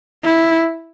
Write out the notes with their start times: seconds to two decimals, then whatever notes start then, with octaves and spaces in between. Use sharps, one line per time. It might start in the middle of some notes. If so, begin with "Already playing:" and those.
0.24 E4